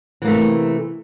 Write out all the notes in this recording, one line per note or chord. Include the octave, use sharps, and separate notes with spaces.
C3 E3 A3 A#3